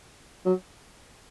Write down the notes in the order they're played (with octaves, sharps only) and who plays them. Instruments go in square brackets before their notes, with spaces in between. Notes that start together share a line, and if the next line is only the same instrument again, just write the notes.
[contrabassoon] F#3